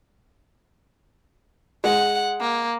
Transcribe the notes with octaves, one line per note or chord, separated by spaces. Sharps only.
G#3 F#5
A#3